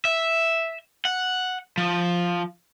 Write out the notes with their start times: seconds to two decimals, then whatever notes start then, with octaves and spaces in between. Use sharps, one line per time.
0.05 E5
1.05 F#5
1.78 F3